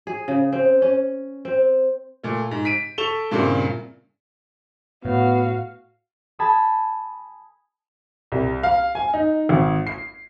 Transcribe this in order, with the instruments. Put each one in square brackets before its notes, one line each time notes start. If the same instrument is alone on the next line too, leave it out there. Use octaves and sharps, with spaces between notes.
[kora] G#4
C#3
C4
C#4
C4
[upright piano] A#2 A3
G#2
B6 D7 D#7
A4 C#6 E7 F7 G7
G2 A#2 C#3 A#3 C4 E4
[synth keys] A2 [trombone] B3 [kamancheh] F#4 F5
[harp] G#5 A5 B5 D#6
[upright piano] C2
F5
G#5
D#4
G#1
C7